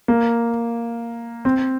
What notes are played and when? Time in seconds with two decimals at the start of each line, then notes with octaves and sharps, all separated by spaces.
0.08 A#3
1.45 C4